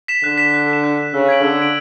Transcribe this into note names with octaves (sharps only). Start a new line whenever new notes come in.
B6 E7
D3 F#6
B6 E7
F#6
B6 E7
F#6
B6 E7
C#3 E6
G#6 B6 D7 F#7
D3 E6
G#6 B6 D7 F#7